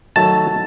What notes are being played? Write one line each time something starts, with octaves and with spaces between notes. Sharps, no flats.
D#3 F#3 A3 A5